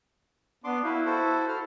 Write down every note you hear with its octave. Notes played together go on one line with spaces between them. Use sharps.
B3 D4 C6 D6
E4 F#4 B4 F5
F#4 A4 C5
A4 F6